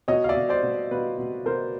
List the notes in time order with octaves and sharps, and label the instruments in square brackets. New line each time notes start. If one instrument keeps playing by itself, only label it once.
[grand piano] B2 C#5 D#5
F5
D5 E5
B2
C5 D5
B2
B2 B4
B2
B2 A#4 C5